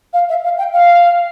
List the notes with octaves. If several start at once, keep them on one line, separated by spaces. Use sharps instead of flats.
F5
E5
F5
G5
F5